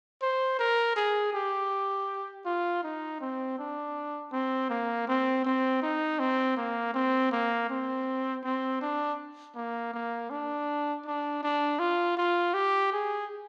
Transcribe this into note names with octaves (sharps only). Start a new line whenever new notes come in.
C5
A#4
G#4
G4
F4
D#4
C4
D4
C4
A#3
C4
C4
D#4
C4
A#3
C4
A#3
C4
C4
D4
A#3
A#3
D4
D4
D4
F4
F4
G4
G#4